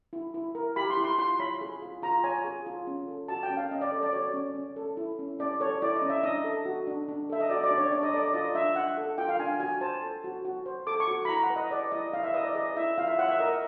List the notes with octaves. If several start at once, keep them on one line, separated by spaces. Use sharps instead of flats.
E4
E4
A#4
G4 B5
C6
E4
C6
F4 C6
C#5 B5
G#4
F4
F4 A#5
C#5 G#5
G#4
F4
C#4
A4
F#4 A5
G5
C#4
F5
C#4 D#5
D5
A4
D5
F#4 C#5
C#4
C#4
A4
E4
C#4
C#4 D5
A4 C#5
E4 D5
D#5
C#4
E5
D4 D#5
A4
F#4
D4
D4
A4 E5
D#5
F#4 D5
D5
D4
C#5
D4 D5
D#5
A4 D5
D5
F4 D#5
D4 E5
D4 F#5
A4
F4 G5
F5
D4 G#5
F#4 G#5
C5 A5
A4
F#4
F#4
C5
A4 D6
C#6
F#4
B5
E4 A#5
F#5
B4
D#5
G#4 D5
E4 D#5
E4 F5
E5
B4 D#5
D5
G#4 D#5
E4 E5
F4 F5
E5
C#5 F#5
E5
A#4 D#5